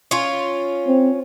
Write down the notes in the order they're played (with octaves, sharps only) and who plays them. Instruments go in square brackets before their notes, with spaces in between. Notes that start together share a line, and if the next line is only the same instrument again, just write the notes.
[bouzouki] C#4 F4
[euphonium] C4